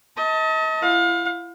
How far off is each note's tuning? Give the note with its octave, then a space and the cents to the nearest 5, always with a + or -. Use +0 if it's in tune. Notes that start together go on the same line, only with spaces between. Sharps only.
D#5 +40 A5 +20
E4 +40 F5 +35